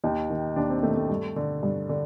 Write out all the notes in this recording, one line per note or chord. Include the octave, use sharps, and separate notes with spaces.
D#2 D#4
D#3
D#2 D4
C4
D#3 A3
A3
G2
D3
G2
D3